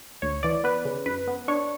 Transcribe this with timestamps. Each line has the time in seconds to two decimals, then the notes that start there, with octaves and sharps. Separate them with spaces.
0.22 D2 C#5
0.43 E3 D5
0.64 B3 B4
0.85 C#3
1.06 F#2 B4
1.28 B3
1.48 D4 C#5